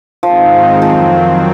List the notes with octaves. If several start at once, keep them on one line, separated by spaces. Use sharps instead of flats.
G#2 D#3 F3 G#3 C4 D#4
F2 D#3 F3 F#3 C4